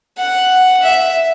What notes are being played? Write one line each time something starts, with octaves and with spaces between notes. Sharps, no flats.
F#5
E5